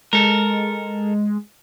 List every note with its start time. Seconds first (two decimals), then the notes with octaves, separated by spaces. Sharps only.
0.13 G#3 A4 A#4